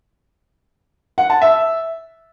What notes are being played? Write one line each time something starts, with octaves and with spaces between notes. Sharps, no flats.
F#5
A5
E5